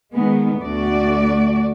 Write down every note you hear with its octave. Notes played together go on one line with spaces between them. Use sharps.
D#3 G#3 B3
D2 A3 F#4 D5